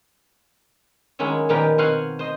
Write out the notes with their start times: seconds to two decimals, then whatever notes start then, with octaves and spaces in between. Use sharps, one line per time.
1.19 D#3 F#3 G#3 C#4 E4
1.49 A#2 D#3 F3 B3 G4 A#4
1.78 B2 C4 F#4 F5 F#5 G#5
2.19 C5 D#5